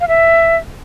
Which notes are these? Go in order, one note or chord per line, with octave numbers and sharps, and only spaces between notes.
F5
E5